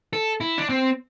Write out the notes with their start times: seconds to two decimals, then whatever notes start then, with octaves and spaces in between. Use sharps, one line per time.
0.13 A4
0.41 E4
0.58 D4
0.69 C4